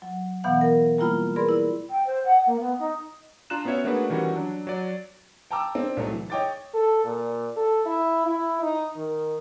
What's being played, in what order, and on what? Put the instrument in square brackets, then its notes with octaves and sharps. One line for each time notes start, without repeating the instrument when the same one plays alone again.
[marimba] F#3
B2 E3 B3 F5 F#5
A#4
G3 A#3 E4 F4 B5 F6
G#4 A#4 B4 D5 B5 C6
E4
[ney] G5
C5
F#5
A#3
B3
D#4
[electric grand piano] D4 F4 A#5 F#6 E7
B3 C#4 F#4 C#5 E5
A3 A#3 D4 F#4 G#4 B4
D#3 E3 G3 C#4 F#4
F#3 D4
F#3 D5
[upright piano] G5 A5 A#5 D6 E6
C4 D4
C2 F#3 A3 D#4
E3
C#5 D#5 G5 D6 A6
[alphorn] A4
A#2
A4
E4
E4
D#4
D#3